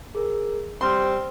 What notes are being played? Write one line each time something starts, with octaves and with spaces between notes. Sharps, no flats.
G#4 A#4
G3 C4 C5 C6 F6